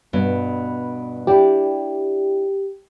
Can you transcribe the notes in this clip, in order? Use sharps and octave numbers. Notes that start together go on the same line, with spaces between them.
G2 B2
D4 E4 G4